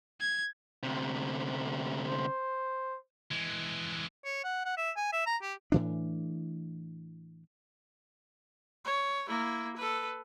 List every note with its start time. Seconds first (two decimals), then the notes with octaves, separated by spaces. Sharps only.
0.21 G#6
0.83 D2 C3
2.09 C5
3.32 E3 G#3
4.25 C#5
4.44 F#5
4.65 F#5
4.77 E5
4.97 G#5
5.13 E5
5.27 A#5
5.42 G4
5.72 A2 E3 D4
8.85 C#5
9.28 A#3 E4
9.77 A4 B4